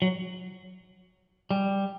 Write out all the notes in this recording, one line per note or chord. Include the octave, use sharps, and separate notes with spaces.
F#3
G3